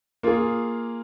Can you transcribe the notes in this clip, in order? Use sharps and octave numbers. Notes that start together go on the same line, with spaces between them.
A#3 F4 G#4